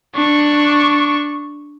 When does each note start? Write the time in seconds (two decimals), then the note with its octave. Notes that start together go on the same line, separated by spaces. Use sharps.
0.16 D4 C#6